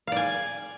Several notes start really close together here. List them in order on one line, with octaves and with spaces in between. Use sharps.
F5 D5 G#5